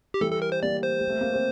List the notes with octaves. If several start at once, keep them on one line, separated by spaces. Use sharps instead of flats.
G4
E3 G3 A4
A4
A#4
C5
G3 A#3 D5
C5
G3
A3
A#3
C4